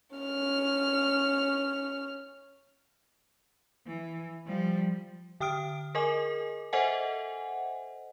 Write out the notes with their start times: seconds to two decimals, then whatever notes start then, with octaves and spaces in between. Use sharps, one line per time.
0.16 C#4 F6
3.86 E3
4.46 F3 G3
5.40 D3 G5 D#6 F6 D7
5.95 G#4 A#4 D#5 G#5 D6
6.73 A4 C5 D#5 E5 F#5 G#5